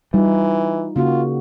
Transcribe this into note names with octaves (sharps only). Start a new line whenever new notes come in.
E3 G3 D#4 F4
C#3 A#3 F4 F#4